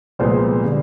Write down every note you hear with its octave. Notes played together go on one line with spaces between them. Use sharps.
C2 A#2 F3 G#3 B3 C5
D3 G3